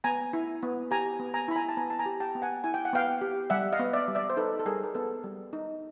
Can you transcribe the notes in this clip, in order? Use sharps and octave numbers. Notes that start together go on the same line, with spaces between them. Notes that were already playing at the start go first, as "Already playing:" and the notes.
B3 G#5 A#5
E4
B3
G4 G#5 A#5
B3
G#5 A#5
E4 B5
G#5 A#5
A5
B3 G#5 A#5
A5
G#5 A#5
G4
G5 A5
B3
F#5 G#5
E4 G#5
G5
F#5
B3 F5 G5
G4
G3 E5 F#5
D#5 F5
B3
D5 E5
G3
D5 E5
C5
D#4 A4 B4
A4
G3 G#4 A#4
A#4
B3 A4 B4
G3
D#4